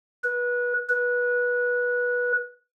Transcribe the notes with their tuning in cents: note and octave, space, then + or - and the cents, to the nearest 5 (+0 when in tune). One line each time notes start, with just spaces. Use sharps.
B4 -25
B4 -20